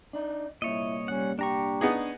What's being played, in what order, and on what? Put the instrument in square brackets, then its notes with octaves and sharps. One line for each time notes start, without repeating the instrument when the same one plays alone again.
[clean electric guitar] D4 D#4
[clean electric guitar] C2 A#2 [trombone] E4 [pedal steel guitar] C#5 D#5
[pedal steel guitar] G3 F#5 [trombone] C#4
[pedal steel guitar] D4 A#5 C#6 [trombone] G4
[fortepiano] B3 D#4 G#4